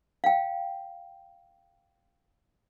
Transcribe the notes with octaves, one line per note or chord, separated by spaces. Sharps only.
F5 G5